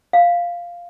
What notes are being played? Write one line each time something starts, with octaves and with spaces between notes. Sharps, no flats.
F5